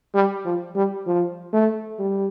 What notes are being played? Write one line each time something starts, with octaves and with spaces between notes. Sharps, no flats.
G3
F3
G3
F3
A3
G3